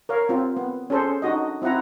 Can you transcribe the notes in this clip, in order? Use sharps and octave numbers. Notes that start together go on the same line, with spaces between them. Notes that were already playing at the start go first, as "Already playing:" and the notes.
A#4 C#5 F5
C4 F4
B3
C#4 G#4 A4 C5
D4 D#4 F#4 D#5
C4 E4 F4 F#5 A#5